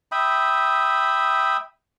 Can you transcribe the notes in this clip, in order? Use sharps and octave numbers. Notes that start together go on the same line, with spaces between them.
E5 G5 B5 D#6